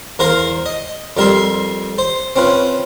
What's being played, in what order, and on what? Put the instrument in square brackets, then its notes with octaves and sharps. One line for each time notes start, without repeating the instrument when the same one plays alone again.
[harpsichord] E2 A#4 C5 F5 A#5
D#5
F2 G3 A#4 E5 C6
C5
C4 C#4 F4 B4